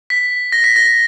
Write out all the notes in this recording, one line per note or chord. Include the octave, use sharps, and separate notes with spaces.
B6
A#6
B6
A#6